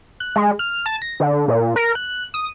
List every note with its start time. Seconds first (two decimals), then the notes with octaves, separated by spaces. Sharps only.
0.20 F#6
0.36 G#3
0.59 F6
0.86 A5
1.02 A#6
1.20 D3
1.48 A#2
1.76 A#4
1.95 F#6
2.34 D#6